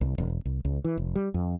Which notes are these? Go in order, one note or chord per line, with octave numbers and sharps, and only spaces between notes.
C2
E1
C2
C#2
E3
F1
G3
F2